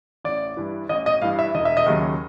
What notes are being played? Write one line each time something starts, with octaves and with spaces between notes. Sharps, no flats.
A1 D5
G2 E3
A1 D#5
D#5
G2 E3 F5
E5
E1 D#5
E5
D#5
D#2 C#3 F#3